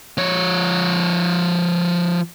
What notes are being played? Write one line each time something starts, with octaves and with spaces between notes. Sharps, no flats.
F3 C#5